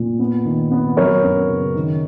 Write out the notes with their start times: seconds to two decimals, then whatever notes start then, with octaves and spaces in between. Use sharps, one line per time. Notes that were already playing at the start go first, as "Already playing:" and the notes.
Already playing: A#2
0.19 B3
0.45 D#3
0.71 B3
0.97 F#3 A#4 C#5
1.23 F#2
1.49 C#3
1.75 D#3